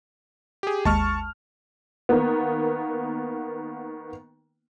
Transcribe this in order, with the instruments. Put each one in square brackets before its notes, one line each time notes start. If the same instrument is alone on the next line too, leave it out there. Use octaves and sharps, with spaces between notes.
[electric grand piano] G4 G#4
[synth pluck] G#1 D#2 G#3 [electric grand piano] A5 C#6 F6
[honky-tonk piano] D#3 A#3 B3